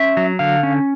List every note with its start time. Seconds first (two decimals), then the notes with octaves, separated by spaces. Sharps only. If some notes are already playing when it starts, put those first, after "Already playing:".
Already playing: C#4 E5
0.17 F#3
0.39 D3 F5
0.63 C#4